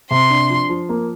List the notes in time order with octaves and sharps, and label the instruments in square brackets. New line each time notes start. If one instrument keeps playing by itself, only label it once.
[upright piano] C3 [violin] C6
[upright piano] D4
F3
F3
A#3